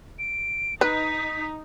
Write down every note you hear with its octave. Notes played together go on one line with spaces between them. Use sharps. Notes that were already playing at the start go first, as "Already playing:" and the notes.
D7
D#4 B4 B6